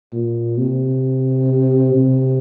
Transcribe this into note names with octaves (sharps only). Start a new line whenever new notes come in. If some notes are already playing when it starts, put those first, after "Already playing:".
A#2
C3
C3